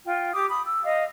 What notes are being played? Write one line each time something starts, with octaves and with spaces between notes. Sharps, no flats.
F4 G5
G4 D6 D#6
B5 D#6
E6
D#5 F5